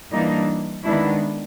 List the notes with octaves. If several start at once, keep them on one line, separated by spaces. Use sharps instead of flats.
E3 G3 A#3 D4 D#4
D#3 G#3 B3 D4 E4